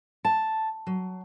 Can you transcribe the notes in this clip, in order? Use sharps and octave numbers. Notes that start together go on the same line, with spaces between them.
A5
F#3